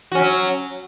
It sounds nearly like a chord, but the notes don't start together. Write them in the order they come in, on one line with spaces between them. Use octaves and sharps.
F#4 C#4 F#3